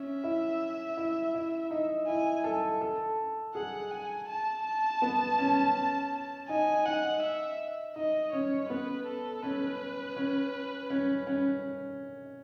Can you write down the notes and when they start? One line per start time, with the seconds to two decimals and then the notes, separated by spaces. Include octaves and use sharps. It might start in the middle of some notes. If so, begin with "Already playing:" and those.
Already playing: C#4 E5
0.24 E4
0.97 E4
1.34 E4
1.71 D#4
2.07 E4 G#5
2.44 A4
2.81 A4
3.55 G#4 F#5
3.91 G#5
4.28 A5
4.65 A5
5.02 B3
5.39 C#4
6.49 D#4 G#5
6.86 D#4 F#5
7.22 E5
7.96 D#4 D#5
8.33 C#4 C#5
8.69 B3 B4
9.07 A4
9.43 C#4 B4
10.16 C#4
10.90 C#4
11.27 C#4